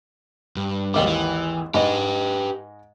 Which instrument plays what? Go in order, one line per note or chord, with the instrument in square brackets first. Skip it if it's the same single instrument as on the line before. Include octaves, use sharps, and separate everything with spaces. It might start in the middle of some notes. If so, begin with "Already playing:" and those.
[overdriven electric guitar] G2
[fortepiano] G#1 D#2 D6 [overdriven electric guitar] G3
[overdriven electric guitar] E3
[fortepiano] G#2 D#5 [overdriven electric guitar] G4 B4